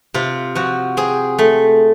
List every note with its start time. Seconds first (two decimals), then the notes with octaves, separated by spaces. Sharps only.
0.14 C3 F4
0.55 F3 F#4
0.97 C4 G#4
1.39 A3